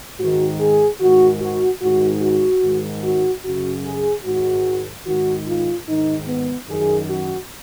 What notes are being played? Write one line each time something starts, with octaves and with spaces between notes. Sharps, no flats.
G#2 D#3 F#4
G#4
G#2 D#3 F#4
F#4
G#2 D#3 F#4
F#4
G#2 D#3
F#4
F#2 C#3 F#4
G#4
G#2 D#3 F#4
G#2 D#3 F#4
F4
G#2 D#3 D#4
B3
F#2 D#3 G#4
F#4